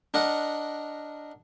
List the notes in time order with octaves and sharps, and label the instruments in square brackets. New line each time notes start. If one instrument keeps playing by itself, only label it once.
[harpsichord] D4 A#4 D#5 F#5